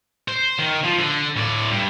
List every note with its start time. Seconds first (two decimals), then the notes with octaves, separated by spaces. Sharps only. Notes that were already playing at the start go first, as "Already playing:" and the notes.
0.28 C5
0.59 D#3
0.84 F3
0.99 D3
1.37 A2 D5
1.71 G2